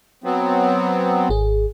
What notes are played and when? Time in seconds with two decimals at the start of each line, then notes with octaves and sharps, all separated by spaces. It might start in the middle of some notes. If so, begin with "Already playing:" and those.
0.24 F#3 B3 C4
1.29 G#1 G#4